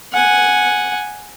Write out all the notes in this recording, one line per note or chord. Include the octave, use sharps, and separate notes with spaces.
F#5 G#5